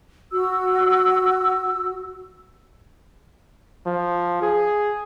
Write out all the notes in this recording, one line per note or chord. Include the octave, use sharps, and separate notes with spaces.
F#4 E6
F3
G#4